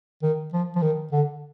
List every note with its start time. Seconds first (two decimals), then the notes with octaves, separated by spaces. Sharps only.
0.23 D#3
0.53 F3
0.76 F3
0.82 D#3
1.12 D3